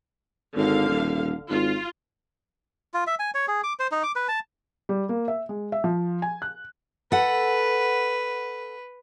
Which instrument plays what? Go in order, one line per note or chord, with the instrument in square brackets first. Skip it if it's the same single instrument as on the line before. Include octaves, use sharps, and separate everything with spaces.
[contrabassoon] G#1 [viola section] D3 F5
[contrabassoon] D#1
[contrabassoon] G#1 [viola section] F4
[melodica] F4
E5
G#5
C#5
G#4
D6
C5
D#4
D6
B4
A5
[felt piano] G3
A#3
E5
G#3
E5
F3
G#5
F#6
[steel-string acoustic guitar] A4 F#5 [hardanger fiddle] B4